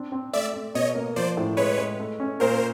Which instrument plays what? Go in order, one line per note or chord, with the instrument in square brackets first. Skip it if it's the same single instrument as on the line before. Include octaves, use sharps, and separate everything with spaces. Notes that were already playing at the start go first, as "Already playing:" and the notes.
Already playing: [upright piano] C4 D4
C4
[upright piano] A3 [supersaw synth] D5 E5
[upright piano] A3
[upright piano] B2 [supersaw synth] C#5 D#5
[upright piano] A#3
[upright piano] F3 [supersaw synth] C5 D5
[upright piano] A2
[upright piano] G#3 [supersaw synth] B4 C#5
[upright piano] G#3
A3
C#4
[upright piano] A#2 [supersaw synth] A#4 C5